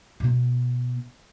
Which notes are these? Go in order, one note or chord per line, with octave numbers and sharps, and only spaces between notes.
B2 B3